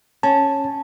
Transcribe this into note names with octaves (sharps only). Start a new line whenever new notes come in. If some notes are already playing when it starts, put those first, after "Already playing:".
C#4 A5